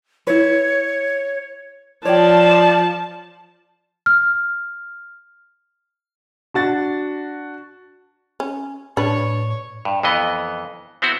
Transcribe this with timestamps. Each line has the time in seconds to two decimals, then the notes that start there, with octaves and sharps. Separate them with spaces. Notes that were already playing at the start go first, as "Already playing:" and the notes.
0.27 E4 B4 C#5
2.05 F3 C#5 D5 G5 A5
4.06 F6
6.54 D4 F#4 A6
8.40 C#4
8.97 A2 D4 B4 C#5
9.85 G2
10.03 F2 E3 B3 D#5
11.02 B3 C4 E4 F#4